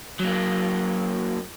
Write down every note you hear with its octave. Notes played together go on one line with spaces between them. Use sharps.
F#3 A#3